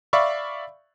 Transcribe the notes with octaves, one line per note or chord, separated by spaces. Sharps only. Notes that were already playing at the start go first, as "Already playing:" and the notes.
D5 E5 F5 B5 C#6